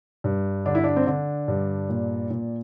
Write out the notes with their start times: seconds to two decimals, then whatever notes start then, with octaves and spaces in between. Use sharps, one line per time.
0.24 G2
0.65 D3 D4
0.75 E4
0.84 D4
0.96 C4
1.07 D3 D4
1.48 G2
1.90 A#2
2.30 A#2